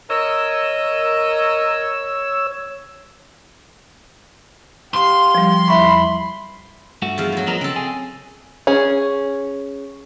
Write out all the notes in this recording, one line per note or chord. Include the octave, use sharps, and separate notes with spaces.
A#4 C#5 D#5 E6
G4 F5 C6
F3 G3
E2 E5 B5 C#6
G2 A3 F#4
E2 F3 F5
E2 F#3
F3 B3 A#4 D#5
C#3 C4 A4
G#4
C#4 G#4